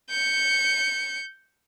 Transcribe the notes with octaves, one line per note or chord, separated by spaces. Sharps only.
G6 C#7